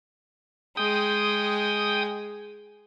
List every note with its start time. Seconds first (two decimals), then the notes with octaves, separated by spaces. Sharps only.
0.77 G#3 G5 D#6